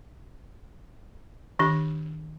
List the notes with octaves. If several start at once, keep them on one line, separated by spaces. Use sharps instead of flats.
D#3 D4 G4